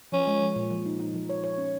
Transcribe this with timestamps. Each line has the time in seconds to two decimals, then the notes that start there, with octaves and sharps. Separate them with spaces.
0.12 F3 C#4
0.27 G#3
0.42 F3
0.56 A#2
0.70 F3
0.86 D#4
1.00 D#4
1.14 F3
1.29 C#5
1.44 C#5
1.58 C#4